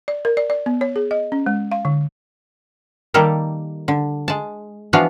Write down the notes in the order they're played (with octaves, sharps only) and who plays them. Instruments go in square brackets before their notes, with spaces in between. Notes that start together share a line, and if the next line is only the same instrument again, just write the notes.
[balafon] D5
A#4
D5
D5
B3
C#5
G#4
D#5
C#4
G#3
F5
D3
[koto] D#3 G3 A#3 G4 A4 A#4
D3
G#3 A5
E3 F3 B3 D4 F#4 F5